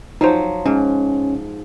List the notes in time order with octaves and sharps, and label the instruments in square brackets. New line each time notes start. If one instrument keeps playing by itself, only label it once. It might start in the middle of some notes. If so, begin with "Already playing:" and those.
[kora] F3 F#3 [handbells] D#4 C5
[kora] G#2 [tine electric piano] C#4